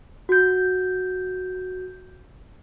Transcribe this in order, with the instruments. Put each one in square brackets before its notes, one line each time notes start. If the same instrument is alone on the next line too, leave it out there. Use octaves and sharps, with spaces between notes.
[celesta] F#4 G6